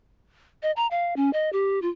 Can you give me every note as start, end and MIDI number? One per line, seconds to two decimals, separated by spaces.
0.63 0.71 75
0.76 0.87 82
0.91 1.14 77
1.16 1.30 61
1.33 1.50 75
1.53 1.81 67
1.82 1.89 65